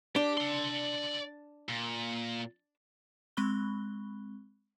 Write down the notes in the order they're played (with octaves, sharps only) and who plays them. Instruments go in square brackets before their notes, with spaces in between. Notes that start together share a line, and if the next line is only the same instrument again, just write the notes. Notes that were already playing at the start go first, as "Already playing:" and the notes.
[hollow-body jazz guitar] D4 [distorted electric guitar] G4
[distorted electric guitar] D5 C6
A#2
[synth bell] G#3 C4 B5 C#6 F#6 G7